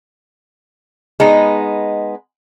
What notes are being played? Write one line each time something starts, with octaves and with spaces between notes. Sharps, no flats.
G#3 B3 D#4